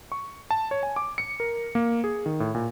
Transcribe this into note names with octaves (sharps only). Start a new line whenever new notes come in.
C#6
A5
C#5
G#5
D6
C#7
A#4
A#3
G#4
D#3
A2
A#2